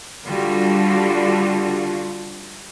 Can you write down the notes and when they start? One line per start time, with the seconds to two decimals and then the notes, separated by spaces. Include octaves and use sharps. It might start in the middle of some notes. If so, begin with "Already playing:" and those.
0.24 D3 G3 F4 F#4